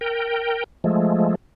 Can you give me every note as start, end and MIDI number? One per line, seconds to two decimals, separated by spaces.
0.01 0.64 70
0.01 0.64 79
0.84 1.35 53
0.84 1.35 56
0.84 1.35 57